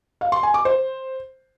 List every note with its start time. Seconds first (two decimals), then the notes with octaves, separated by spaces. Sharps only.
0.21 F5
0.32 C6
0.43 G#5
0.54 D6
0.65 C5